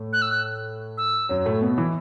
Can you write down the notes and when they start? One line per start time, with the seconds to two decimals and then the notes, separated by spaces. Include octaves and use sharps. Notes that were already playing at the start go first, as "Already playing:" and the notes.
Already playing: A2 A3
0.13 F#6
0.22 E6
0.31 F#6
0.98 E6
1.29 F#2 F#3
1.46 A2 A3
1.61 B2 B3
1.78 E3 E4